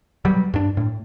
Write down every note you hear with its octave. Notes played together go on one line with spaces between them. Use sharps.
B2 F#3 G3
G2 D4
A2